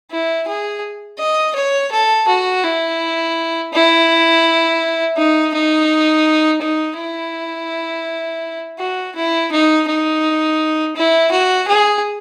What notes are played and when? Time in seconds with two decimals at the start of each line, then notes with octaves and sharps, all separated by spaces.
0.11 E4
0.48 G#4
1.19 D#5
1.55 C#5
1.91 A4
2.28 F#4
2.64 E4
3.73 E4
5.17 D#4
5.54 D#4
6.62 D#4
6.97 E4
8.79 F#4
9.15 E4
9.51 D#4
9.88 D#4
10.96 E4
11.31 F#4
11.68 G#4